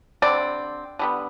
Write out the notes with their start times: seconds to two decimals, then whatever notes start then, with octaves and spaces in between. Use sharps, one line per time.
0.22 D3 G3 C4 D5
0.99 D3 G3 B3